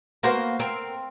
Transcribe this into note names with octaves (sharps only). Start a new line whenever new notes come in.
A#3 B3 F#4 C5 A#5
C4 A#4